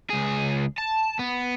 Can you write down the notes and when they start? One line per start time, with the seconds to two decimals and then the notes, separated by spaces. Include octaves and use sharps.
0.10 C#2 G#4
0.78 A5
1.19 B3